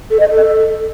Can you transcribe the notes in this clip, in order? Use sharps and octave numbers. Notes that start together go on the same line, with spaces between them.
A4
D#5
A4